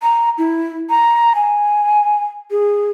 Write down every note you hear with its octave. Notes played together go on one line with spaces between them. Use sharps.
A#5
E4
A#5
G#5
G#4